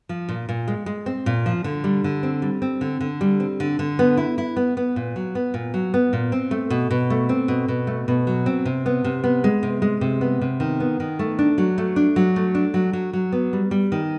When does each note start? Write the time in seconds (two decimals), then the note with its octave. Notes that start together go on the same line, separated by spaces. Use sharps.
0.09 F3
0.29 A#2
0.49 A#2
0.68 G#3
0.86 G#3
1.06 C4
1.26 A#2
1.46 F3
1.64 D3
1.84 G3
2.04 D3
2.23 C4
2.42 G3
2.62 C4
2.81 D3
3.01 D3
3.21 G3
3.40 C4
3.60 D3
3.79 D3
3.99 B3
4.17 E4
4.38 E4
4.57 B3
4.77 B3
4.96 A#2
5.16 F#3
5.35 B3
5.54 A#2
5.74 F#3
5.94 B3
6.13 A#2
6.32 C4
6.51 A3
6.70 B2
6.91 B2
7.10 A3
7.29 C4
7.48 B2
7.68 B2
7.87 A3
8.08 B2
8.27 F#3
8.46 C4
8.65 C3
8.86 B3
9.04 C3
9.24 B3
9.44 G#3
9.63 C3
9.82 G#3
10.01 C3
10.21 B3
10.41 C3
10.60 D#3
10.80 B3
11.00 D#3
11.19 A3
11.39 D4
11.58 F#3
11.78 A3
11.96 D4
12.16 F#3
12.36 A3
12.55 D4
12.74 F#3
12.93 F#3
13.13 F#3
13.32 B3
13.53 G3
13.71 G3
13.92 D#3